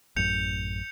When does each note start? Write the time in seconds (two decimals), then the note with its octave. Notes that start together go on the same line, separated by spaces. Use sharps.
0.16 A1 F#2 G6 C#7 F7